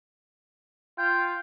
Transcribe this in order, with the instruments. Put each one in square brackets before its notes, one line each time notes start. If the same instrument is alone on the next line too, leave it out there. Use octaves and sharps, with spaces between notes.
[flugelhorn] F4 [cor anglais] G5